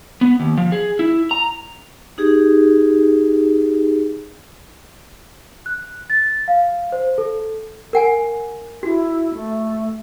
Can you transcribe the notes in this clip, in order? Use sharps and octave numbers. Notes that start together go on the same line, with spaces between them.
B3
D#2
F3
G#4
E4
A#5
D#4 G4 G#4
F#6
A6
F5
C5
A4
A#4 F#5 G#5
E4 F#4
A3